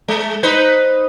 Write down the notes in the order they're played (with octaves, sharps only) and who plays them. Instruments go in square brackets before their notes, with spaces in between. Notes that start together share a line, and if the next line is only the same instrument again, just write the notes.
[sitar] G#3
D#4 B4 C5